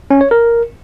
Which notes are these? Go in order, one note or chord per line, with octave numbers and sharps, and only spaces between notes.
C#4
C#5
A#4